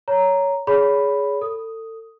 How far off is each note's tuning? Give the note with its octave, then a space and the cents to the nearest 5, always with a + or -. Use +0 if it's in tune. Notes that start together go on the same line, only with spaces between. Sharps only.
C#5 +10 A#5 +0
G#4 +0 C#5 +30 B5 +0
A4 +30 D#6 +0